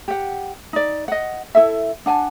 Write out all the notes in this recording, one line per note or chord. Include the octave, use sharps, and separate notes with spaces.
G4 F#5
D#4 D5
D#5 F#5
E4 A4 E5
D4 F#5 G#5 A5